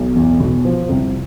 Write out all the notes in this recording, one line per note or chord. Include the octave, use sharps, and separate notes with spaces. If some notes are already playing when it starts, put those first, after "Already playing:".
Already playing: B1
E2
B2
F3
C2